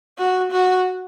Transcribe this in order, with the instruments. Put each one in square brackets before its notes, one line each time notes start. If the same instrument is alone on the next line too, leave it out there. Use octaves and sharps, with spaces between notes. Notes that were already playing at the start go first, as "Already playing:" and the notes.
[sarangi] F#4
F#4